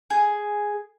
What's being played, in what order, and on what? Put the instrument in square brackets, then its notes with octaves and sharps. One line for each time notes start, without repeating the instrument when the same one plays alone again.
[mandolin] G#4